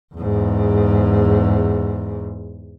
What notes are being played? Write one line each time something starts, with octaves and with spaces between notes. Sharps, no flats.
E2 G#2